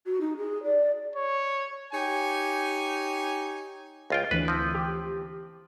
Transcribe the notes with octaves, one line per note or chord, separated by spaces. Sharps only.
F#4
D#4
G#4
D5
C#5
D#4 G4 C#5 G#5
C#2 F4 G5
D2 E3 B4
F3 C4
G4